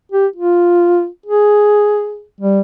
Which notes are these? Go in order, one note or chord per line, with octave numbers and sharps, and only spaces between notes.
G4
F4
G#4
G3